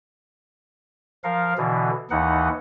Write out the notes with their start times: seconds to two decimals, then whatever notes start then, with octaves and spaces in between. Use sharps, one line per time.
1.24 F3 A#4 F5
1.57 B2 D3 E3
2.11 D#2 E3 D#4 F#5